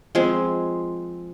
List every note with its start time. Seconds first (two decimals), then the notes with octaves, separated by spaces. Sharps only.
0.15 F3 G#3 C4